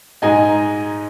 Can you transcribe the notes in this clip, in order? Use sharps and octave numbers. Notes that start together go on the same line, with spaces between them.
G#2 G#3 D#4 D#5 G#5